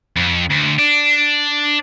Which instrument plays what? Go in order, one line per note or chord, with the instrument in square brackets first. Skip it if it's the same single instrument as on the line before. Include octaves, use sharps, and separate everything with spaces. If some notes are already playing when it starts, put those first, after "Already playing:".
[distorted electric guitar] F2
D2
D4